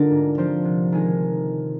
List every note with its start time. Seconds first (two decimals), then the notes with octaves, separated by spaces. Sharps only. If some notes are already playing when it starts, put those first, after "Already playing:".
Already playing: D3 D#4 F4 A#4 D5
0.11 G#2
0.38 F3 C4 G4 C5
0.65 C3
0.92 D#3 G#3 D#4 G#4